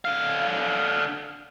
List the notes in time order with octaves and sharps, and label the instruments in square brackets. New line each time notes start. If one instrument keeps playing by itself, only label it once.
[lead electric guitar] D3 F5